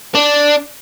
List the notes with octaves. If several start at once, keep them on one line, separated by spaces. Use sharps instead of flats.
D4